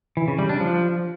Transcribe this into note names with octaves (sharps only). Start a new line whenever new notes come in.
E3
C#3
G3
D4
F3